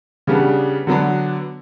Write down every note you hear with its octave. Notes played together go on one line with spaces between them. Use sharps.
C#3 G3 B3 D4
D3 F#3 B3 D4